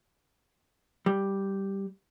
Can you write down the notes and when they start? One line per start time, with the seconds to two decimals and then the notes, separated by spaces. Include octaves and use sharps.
1.06 G3